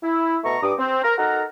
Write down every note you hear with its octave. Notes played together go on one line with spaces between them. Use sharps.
E4
B2 A3 A#5 C#6
G2 D6 D#6
C4
A#4
D#4 F#4 A4 A#4 F#5 A#5